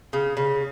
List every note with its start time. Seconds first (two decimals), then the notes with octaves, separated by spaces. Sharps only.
0.13 C#3
0.37 C#3